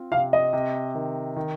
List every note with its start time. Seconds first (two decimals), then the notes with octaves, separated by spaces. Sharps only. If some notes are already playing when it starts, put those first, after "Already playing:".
Already playing: C4 F4
0.12 C3 F5
0.33 D#5
0.53 C3
0.95 D#3
1.36 D#3